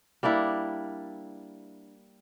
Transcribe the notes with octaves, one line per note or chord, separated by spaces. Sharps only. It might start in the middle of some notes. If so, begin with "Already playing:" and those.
G3 A#3 D4 E4